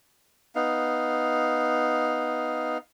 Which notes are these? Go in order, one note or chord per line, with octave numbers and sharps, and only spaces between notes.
B3 D#4 F5